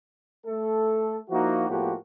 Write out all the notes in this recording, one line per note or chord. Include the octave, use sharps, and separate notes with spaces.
A3 A4
F3 A#3 D#4 E4 F#4
A2 F3 A#3 B3 F#4 G4